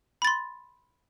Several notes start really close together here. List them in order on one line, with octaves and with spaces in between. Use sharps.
B5 A6 C6